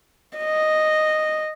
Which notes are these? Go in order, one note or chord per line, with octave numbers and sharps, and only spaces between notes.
D#5